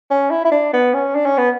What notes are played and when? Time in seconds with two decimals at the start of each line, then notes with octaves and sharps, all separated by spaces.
0.11 C#4
0.30 E4
0.45 E4
0.51 D4
0.73 B3
0.94 C#4
1.15 D4
1.26 C#4
1.38 B3